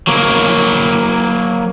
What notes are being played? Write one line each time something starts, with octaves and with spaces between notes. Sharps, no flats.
F#3 A#3